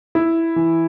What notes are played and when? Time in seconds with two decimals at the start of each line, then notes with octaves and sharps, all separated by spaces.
0.15 E4
0.56 E3